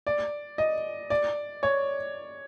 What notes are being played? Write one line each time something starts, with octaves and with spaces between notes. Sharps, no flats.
D5
D#5
D5
C#5